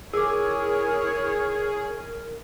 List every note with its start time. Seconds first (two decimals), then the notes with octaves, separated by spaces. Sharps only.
0.13 E4 G#4 A#4 C#5 D6 E6